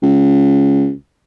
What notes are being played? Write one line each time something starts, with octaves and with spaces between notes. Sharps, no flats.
C#2